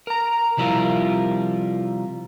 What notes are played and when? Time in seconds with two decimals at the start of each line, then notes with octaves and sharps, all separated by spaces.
0.07 A#4 A#5
0.57 C3 F3 G3 E4 F4 A#4